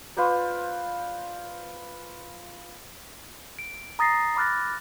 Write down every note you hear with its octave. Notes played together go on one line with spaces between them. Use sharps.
F4 B4 C5 D5
D7
A#5 D#6 A6 A#6 C7
B5 D6 F6 F#6 A6 A#6